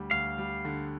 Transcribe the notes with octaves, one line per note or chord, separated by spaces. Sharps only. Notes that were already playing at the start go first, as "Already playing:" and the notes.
Already playing: D2 G3
D2 F5
G3
D3